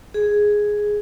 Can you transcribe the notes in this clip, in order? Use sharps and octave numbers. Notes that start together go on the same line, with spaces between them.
G#4